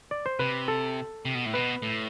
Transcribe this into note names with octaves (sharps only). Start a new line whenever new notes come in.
D5
C5
C3 B4
A4
C3
B2
A2
B2 B4
A2